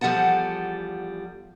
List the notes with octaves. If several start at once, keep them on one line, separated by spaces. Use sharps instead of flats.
E2 F3 G3 A4 F#5 A5